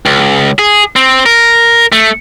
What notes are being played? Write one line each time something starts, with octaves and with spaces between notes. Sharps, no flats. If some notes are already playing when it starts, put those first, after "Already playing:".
C#2
G#4
C4
A#4
A3